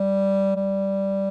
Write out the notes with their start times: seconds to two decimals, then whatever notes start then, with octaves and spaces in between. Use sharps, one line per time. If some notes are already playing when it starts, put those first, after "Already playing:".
Already playing: G3
0.56 G3